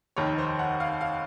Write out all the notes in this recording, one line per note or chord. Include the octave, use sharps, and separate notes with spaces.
F1 D#2 D#3 C#5
C5
F#5
F5
F5